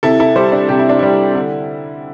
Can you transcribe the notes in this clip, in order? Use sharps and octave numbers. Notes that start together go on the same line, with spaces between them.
C3 E4 A4
E4 A4
G3 G4 C5
D4
C3 G4
E4
D4
G3 E4
D3